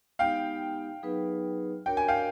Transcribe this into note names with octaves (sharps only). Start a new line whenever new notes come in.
G#3 B3 D#4 G4 F5 G5
F#3 B3 D#4 G#4 B4
D4 F#4 A#4 C#5 G5
G#5
F5 G5